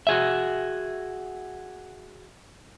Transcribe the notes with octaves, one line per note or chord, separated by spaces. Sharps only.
F#4 G#4 E5